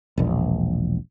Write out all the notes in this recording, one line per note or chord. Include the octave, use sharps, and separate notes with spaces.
E1 A#1